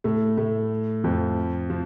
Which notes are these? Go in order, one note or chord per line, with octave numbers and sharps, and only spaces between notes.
A2 A3
A2 A3
F2 F3
F3